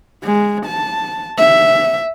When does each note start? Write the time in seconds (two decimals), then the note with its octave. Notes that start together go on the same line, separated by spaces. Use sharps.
0.23 G#3
0.66 A5
1.38 E5